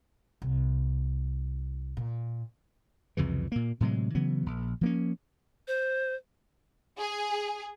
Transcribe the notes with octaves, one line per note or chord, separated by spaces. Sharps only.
C2
A#2
C2 F2 C#3 E3
A#2 A#3
A2 C3 F#3 G#3
C#3 E3 F#3 B3
A#1
F3 A#3 C#4
C5
G#4